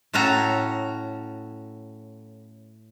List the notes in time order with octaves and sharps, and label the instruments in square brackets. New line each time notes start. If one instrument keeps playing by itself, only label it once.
[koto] A2 C#4 F#4 A4 A#5